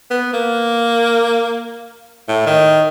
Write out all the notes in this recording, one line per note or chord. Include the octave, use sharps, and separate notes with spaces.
B3
A#3
A2
D#3